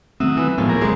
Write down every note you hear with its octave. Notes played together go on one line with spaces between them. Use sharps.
D#3 F#3 A3 C4 E5 D#6
E3
D#2 A2 F3 G#3 A3 B3
A#3 G#4 A#4
F1 C2 F#2 G#3